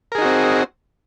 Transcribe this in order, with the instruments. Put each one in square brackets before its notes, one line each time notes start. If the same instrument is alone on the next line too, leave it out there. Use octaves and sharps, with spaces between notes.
[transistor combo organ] A#4
G#4
D#4
F#4
C4